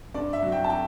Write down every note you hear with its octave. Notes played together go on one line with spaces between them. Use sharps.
G2 D5
E5
F#3
G5
A5
G5